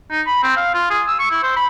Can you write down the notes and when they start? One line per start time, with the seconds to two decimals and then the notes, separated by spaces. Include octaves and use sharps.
0.11 D#4
0.26 B5
0.43 C4
0.57 F5
0.74 F4
0.90 G#4
1.07 E6
1.19 C#6
1.31 E4
1.43 C5
1.56 B5